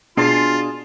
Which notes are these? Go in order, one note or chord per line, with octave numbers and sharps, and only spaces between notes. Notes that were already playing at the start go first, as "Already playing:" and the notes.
B2 D4 F4 G#4 A5 C6